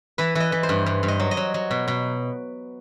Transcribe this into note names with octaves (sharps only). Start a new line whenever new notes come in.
E3 B4
E3 D#5
E3
C5
G2
G2
G2
D#5
F#3
D#5
F#3
F#3
B2
B2